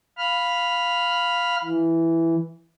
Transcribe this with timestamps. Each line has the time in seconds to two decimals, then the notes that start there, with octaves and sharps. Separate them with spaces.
0.18 F5 B5 F6
1.64 E3